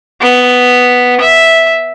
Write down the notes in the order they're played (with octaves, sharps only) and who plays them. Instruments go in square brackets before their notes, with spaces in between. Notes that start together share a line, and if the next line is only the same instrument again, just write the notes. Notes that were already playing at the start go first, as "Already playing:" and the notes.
[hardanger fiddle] B3
E5